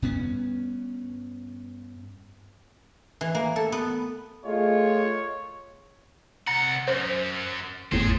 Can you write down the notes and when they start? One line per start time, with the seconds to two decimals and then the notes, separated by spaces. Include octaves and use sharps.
0.02 G2 B3 C#4
3.21 E3
3.35 A#3
3.56 A4
3.72 B3
4.45 A3 F4 G#4 C#5 D#5
6.47 C2 F#5 A#5
6.88 F#2 C5
7.92 G#1 E2 A2 G#4 C5